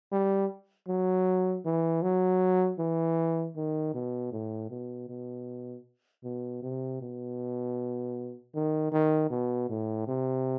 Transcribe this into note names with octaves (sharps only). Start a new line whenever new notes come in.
G3
F#3
E3
F#3
E3
D#3
B2
A2
B2
B2
B2
C3
B2
D#3
D#3
B2
A2
C3